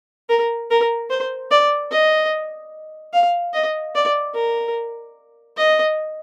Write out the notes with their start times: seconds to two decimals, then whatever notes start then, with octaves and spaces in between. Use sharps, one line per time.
0.29 A#4
0.71 A#4
1.10 C5
1.51 D5
1.91 D#5
3.14 F5
3.53 D#5
3.95 D5
4.35 A#4
5.57 D#5